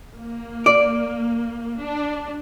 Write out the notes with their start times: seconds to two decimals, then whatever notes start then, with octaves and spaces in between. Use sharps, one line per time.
0.15 A#3
0.66 D5
1.80 D4